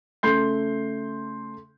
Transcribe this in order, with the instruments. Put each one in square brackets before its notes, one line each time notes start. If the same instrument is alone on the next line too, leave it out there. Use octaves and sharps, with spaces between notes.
[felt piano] C#3 A3 C6 G6 C7